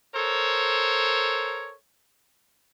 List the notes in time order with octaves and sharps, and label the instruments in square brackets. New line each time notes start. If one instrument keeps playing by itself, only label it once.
[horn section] A4 A#4 C5 C#5